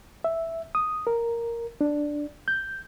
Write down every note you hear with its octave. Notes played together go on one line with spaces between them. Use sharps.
E5
D#6
A#4
D4
G6